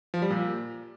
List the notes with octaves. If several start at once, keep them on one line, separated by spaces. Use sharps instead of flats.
F3
G3
A#2